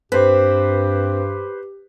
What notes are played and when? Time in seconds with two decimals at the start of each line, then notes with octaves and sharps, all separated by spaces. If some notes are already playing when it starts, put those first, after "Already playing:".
0.12 G2 C4 G4 B4 C5